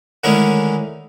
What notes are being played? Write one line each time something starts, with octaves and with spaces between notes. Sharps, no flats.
D3 D#3 G#3 A3 C#4 E4